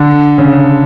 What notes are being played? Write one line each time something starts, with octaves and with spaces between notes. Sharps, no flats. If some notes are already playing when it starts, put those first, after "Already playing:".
Already playing: D3
C#3